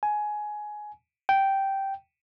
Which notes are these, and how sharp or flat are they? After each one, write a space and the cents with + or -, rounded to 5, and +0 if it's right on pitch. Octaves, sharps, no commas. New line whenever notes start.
G#5 +15
G5 -10